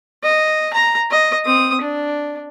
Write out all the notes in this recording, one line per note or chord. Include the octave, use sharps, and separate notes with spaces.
D#5
A#5
D#5
C4 D#6
D4